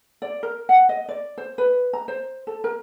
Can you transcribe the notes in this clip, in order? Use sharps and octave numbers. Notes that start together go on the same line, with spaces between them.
D5
A#4
F#5
D#5
D5
C5
B4
A#5
C5
A4
A#4